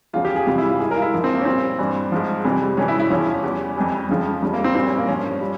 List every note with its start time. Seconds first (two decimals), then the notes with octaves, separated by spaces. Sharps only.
0.13 E2 C#3 F3 F4
0.25 G4
0.36 G#4
0.47 F2 C3 E3 G3 F4
0.58 E4
0.69 F4
0.80 G#2 G3 G#4
0.91 A#4
0.97 F4
1.02 E4
1.13 G#2 F3
1.24 C4
1.35 A#3
1.41 C#4
1.45 A#2 G3 C4
1.78 G2 E3 G3
2.12 G#2 F3
2.44 F2 C3 E3 G3
2.77 F2 C3 E3 G3 C#4
2.88 E4
2.99 E4
3.10 E2 C#3 F3 C#4
3.43 E2 E3 G3
3.76 F2 E3 G3
4.09 F2 C#3 F3
4.42 F2 C#3 G3
4.53 A#3
4.64 C4
4.75 G3 C4
4.78 A#2
4.86 C#4
4.98 A#3
5.08 G2 F3 C#4
5.41 G3